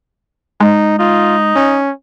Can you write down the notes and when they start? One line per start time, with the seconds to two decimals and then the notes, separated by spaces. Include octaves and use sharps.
0.60 G#3 D#4
0.99 D#4 F4
1.56 C#4